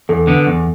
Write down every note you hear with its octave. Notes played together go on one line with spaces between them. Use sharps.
E2 A4
D3 B3
E2